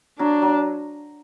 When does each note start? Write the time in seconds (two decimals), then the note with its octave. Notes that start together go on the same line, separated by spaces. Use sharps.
0.19 F#3 D4
0.42 F#3